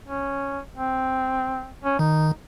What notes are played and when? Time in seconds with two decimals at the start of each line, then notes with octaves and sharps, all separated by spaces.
0.07 C#4
0.77 C4
1.84 C#4
1.99 D#3 D#4